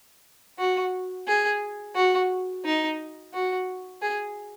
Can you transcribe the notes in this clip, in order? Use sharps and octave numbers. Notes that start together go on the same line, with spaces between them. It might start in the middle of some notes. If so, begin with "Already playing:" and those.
F#4
G#4
F#4
D#4
F#4
G#4